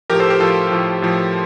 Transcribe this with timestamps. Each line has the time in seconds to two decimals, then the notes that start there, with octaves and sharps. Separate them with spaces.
0.10 F3 G4 A#4
0.13 A2
0.20 A4 C5
0.30 G4 A#4
0.40 A2 F3 F4 A4
0.72 A2 F3
1.02 A2 F3